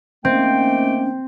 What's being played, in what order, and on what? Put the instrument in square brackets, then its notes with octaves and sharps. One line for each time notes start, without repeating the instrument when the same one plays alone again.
[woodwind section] D#3 A3 A#3 [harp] C4 [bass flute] C#4 [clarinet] G5